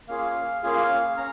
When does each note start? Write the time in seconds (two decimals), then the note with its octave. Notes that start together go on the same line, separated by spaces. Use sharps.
0.08 A#3 C#4 F4 G#4 F5
0.63 A#3 C#4 F4 G#4 F5
1.17 C#4 A#5